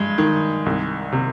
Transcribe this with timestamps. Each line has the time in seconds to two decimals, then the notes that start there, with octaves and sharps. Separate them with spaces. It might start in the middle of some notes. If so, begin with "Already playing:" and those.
Already playing: G2 G#3
0.18 D#3
0.66 C2
1.12 C3